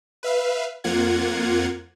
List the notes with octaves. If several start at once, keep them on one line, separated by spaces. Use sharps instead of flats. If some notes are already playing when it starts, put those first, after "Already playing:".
B4 E5 F5
F2 A#3 F4 F#5 G#6